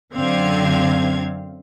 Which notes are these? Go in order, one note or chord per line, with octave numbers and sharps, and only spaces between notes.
F#2 D3 C4 F5 G#6